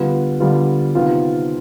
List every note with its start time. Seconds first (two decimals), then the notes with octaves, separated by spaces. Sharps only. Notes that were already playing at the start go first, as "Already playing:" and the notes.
Already playing: D3 G3 B3 F4
0.40 D3 G3 B3 F4
0.95 C3 D#3 B3 F4